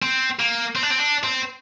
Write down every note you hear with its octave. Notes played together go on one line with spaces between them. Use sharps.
C4
A#3
C4
D4
C4
D4
C4